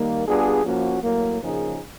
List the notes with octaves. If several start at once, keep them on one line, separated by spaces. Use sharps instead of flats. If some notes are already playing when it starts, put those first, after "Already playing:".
Already playing: D#3 G3 A#3
G3 B3 D4 F4 G#4
F3 A#3 C#4 F#4
A2 F#3 A#3
C#3 F3 A#3 D#4 G#4